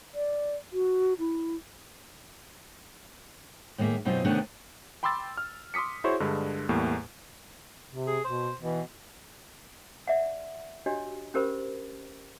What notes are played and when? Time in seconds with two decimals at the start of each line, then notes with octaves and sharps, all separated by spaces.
0.15 D5
0.73 F#4
1.19 E4
3.78 A2 D#3 G#3 A#3 E5
4.05 F#2 B2 C4 D#4 F4
4.25 C3 D#3 A3 B3 C#4 D4
5.03 G5 B5 C6 D6 E6 A6
5.37 F6
5.74 C6 D6 D#6 B6 C#7
6.04 E4 F#4 G#4 C5 C#5 C#6
6.20 G2 D3 G#3
6.69 E2 A2 G3 A#3
7.89 C3
8.07 G#4
8.25 B2 C5
8.60 B2 E3
10.07 D5 E5 F#5
10.86 D4 F#4 G4 C#5 D#5
11.34 C#4 G4 A#4 C5 B5